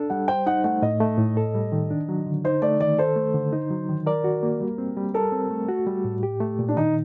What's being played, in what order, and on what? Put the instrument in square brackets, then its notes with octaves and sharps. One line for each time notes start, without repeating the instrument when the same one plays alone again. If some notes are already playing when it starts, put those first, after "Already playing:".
Already playing: [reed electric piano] D4 A4
[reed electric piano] G3 [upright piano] F#5
[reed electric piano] C5 [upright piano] G5
[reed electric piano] D#4 [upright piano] F#5
[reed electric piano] A3 [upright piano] F#5
[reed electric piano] A2 [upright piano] D#5
[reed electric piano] A3
A2
A4
G3
D#3
D4
F#3
D3
[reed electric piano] D#4 [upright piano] C5
[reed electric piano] A3 [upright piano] D5
[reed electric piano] D#3 [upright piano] D5
[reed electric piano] A4 [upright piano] C5
[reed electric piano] A3
D3
D#4
F#3
D#3
[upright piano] A#4 [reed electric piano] D5
[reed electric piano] F#4
A#3
G3
C4
G3
[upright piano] A4 [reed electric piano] A#4
[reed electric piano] C4
A3
F#4
G3
A2
G4
A3
A#2
[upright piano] D4
[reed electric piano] D#3 [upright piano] D#4